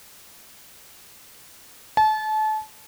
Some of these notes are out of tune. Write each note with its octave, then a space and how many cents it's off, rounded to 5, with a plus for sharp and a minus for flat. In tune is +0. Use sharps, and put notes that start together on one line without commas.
A5 -30